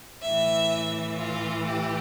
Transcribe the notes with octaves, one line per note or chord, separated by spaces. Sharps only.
A2 E3 E5
F4
G4